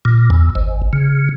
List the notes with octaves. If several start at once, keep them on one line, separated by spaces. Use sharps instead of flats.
A#2
E2
G#1
C#3